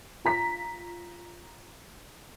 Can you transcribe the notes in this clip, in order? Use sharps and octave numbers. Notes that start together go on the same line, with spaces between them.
F4 A#5 B6